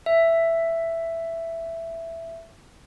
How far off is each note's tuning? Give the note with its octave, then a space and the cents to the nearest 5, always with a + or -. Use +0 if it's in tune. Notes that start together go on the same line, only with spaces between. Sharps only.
E5 +5